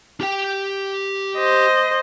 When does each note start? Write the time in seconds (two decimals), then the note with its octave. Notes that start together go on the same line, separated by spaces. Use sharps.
0.21 G4 G5
1.38 C5 D#5